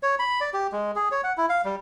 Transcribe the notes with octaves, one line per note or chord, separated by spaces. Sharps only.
C#5
B5
D5
G4
G#3
G#4
C#5
F#5
E4
F5
G3